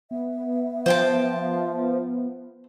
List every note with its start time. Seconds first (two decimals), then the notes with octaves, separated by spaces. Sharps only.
0.11 B3 E5
0.86 F3 C5 G5 A5